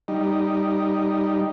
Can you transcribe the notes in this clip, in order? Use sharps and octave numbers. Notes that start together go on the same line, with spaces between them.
G3 D#4